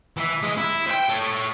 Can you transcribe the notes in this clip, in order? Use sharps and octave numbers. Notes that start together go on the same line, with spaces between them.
E3 E4
G#3
E4
C5 G5
A4 C#5